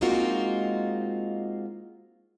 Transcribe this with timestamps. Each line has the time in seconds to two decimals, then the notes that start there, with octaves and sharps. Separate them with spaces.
0.01 G#3 A#3 C4 D#4 F4 F#4